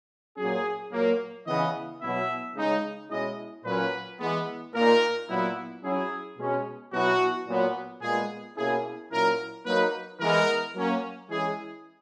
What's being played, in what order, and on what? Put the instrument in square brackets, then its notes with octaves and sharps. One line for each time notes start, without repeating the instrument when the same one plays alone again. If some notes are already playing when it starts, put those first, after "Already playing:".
[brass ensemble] A#2 F#3 C#4 G#4
A#2 F#3 A#3
C#3 E3 B3 D#5
B2 F#3 B3 E4 E5
C#3 G#3 D#4
B2 G#3 C#4 E4 D#5
A#2 F#3 C#4 B4
E3 G#3 B3
A#2 A#3 D#4 A#4
A#2 F#3 B3 E4
F#3 C#4 E4 G#4
B2 G#3 C#4
B2 F#3 B3 E4 F#4
A#2 F#3 B3
A#2 G#3 B3 G#4
B2 A#3 C#4 E4 G#4
A#2 F#3 C#4 E4 A#4
F#3 A#3 D#4 B4
E3 G#3 B3 A#4
F#3 A#3 C#4
E3 G#3 C#4 E4 G#4